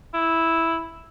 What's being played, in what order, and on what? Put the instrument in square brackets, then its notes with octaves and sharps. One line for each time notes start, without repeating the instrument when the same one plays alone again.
[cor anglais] E4